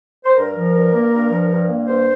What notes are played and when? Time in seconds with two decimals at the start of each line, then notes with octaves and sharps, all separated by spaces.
0.25 C5
0.36 G2 A#4
0.55 F3
0.74 G2
0.93 A#3
1.11 G2
1.30 F3
1.49 G2
1.68 A#3
1.87 G2 C5